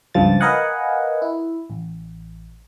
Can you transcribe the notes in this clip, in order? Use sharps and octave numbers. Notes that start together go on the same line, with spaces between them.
C#2 G2 F3 A6
A#4 B4 D#5 F5 F#5 G#5
E4
A1